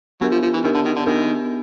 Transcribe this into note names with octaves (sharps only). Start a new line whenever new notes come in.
F#3 B3 D4 G4 A#4
F3
F3
E3
D#3 B3 D4 G4 A#4
D3
D#3
D3
D#3 B3 D4 G4 A#4